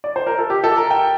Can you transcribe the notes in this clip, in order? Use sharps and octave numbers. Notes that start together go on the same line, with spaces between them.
D5
C5
A#4
A4
G4
A4
A#4
G5